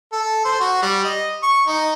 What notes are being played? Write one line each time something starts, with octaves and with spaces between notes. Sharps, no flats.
A4
C5
F#4
G3
D#5
C#6
D#4